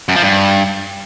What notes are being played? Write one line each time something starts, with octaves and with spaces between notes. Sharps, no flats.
F#2
F3
G2